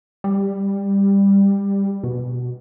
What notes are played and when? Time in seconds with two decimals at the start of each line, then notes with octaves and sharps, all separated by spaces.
0.24 G3
2.04 B2